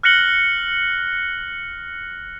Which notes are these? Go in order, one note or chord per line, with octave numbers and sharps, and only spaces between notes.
F6 F#6 A#6 C#7 F#7 G7